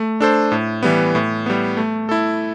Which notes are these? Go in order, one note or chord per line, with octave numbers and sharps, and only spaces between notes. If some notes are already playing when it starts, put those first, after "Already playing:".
Already playing: A3
D4 A4 C5
A2
E3 G3 B3
A2
G3 B3
A3
E4 A4